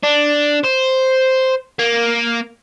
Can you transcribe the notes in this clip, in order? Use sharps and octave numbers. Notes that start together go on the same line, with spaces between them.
D4
C5
A#3